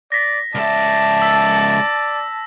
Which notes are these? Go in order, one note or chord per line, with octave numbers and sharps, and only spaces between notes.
D5 A#6 B6
C#2 D5 E5 A5
E6 B6